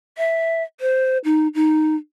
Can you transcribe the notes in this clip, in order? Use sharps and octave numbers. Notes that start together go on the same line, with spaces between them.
E5
C5
D#4
D#4